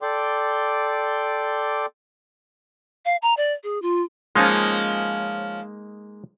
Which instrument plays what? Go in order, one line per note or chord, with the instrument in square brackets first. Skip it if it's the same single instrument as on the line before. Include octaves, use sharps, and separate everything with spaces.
[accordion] A4 D5 G5 C6 D6
[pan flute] F5
A#5
D5
G#4
F4
[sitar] F3 C#4 F4 [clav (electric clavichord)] G#3 A#3 D#4